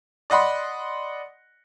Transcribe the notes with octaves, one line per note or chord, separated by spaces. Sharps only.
D5 D#5 F#5 B5 C6